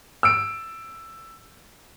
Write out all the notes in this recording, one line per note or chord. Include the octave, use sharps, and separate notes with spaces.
E6 D7